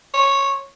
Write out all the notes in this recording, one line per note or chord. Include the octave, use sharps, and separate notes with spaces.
C#5